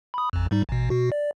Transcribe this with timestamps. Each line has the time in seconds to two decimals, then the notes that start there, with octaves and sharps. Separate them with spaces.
0.14 B5 D#6
0.33 A1 F2
0.51 G#2 G3 D#4
0.69 A1 B2
0.90 B2 F#4
1.12 D5